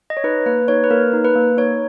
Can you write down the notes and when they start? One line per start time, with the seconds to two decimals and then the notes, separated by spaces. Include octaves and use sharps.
0.10 D#5
0.17 C#5
0.24 D#4 B4
0.46 A#3 B4
0.68 D#4 C#5
0.84 B4
0.91 A#3 A#4
1.13 D#4
1.25 B4
1.35 A#3
1.57 D#4 C#5